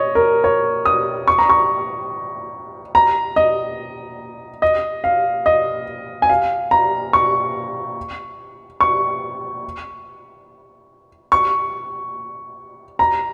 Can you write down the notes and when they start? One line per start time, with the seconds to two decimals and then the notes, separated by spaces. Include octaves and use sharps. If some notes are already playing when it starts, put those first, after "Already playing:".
Already playing: C#5 D#5
0.15 A#4
0.44 C#5
0.85 D#6
1.28 C#6
1.39 A#5
1.50 C#6
2.95 A#5
3.36 D#5
4.62 D#5
5.04 F5
5.46 D#5
6.22 G#5
6.29 F5
6.71 A#5
7.13 C#6
8.81 C#6
11.32 C#6
12.99 A#5